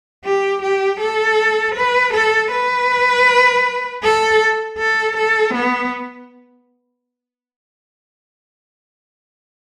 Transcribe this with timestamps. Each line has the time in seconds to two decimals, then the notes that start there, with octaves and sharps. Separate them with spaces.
0.25 G4
0.63 G4
1.01 A4
1.76 B4
2.14 A4
2.52 B4
4.03 A4
4.79 A4
5.17 A4
5.55 B3